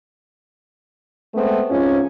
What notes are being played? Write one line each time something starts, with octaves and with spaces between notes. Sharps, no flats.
G#3 A3 B3 C4
F2 G#2 G#3 C#4 F4